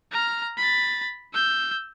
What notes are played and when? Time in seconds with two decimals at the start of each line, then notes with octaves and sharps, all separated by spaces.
0.12 A#5 F6
0.58 B5 A6
1.34 E6 G6